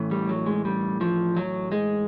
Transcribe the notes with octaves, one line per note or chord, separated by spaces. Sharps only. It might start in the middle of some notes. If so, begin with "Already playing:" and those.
Already playing: A2 E3
G3
F#3
G#3
G3
F3
F#3
G#3